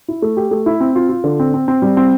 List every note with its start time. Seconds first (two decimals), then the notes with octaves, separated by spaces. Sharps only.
0.08 E4
0.22 A3
0.37 G4
0.51 A3
0.66 E4
0.80 C4
0.96 F4
1.09 F4
1.24 D3
1.40 C4
1.54 C4
1.68 C4
1.82 G3
1.97 C4